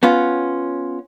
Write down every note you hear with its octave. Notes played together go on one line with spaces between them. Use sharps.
B3 C#4 F4